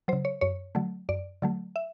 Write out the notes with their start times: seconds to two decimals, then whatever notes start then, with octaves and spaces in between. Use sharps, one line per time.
0.08 C#3 F#3 C5
0.25 C#5
0.41 F#2 C#5
0.75 D3 F#3 A3
1.09 F#2 D5
1.42 D3 F#3 A3
1.76 E5